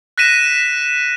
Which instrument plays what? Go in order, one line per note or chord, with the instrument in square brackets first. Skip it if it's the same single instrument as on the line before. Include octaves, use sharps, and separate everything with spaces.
[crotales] F#6 A#6 B6 D#7 E7